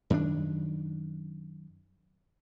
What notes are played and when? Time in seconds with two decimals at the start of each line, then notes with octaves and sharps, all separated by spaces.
0.10 F#2 D#3 B3 D4